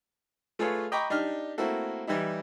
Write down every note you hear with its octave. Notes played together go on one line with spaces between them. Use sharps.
A3 F4 G#4 A4 B4 C#5
D#5 G5 A#5 B5 C#6 D6
D4 D#4 G4 F6
A3 A#3 C4 E4 F#4 A4
E3 G3 D#4 E4